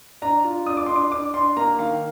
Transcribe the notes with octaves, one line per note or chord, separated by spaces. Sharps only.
D4 A#5
F4
D4 D#6
D6
D4 C6
D6
D4 D6
D4 C6
A#3 A#5
D#3 F5